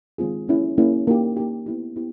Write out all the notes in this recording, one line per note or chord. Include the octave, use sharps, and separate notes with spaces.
D#3 G#3 C4 F4 G#4
A#3 C#4 E4 G#4
A#3 C#4 E4 G#4
A#3 D#4 G4
A#3 D#4 G4
B3 E4 G4
B3 E4 G4